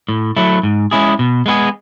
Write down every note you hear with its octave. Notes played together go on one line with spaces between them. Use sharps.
A2
F#3 A3 E4
G#2
G#3 C#4 E4 G#4
B2
G#3 B3 E4 G#4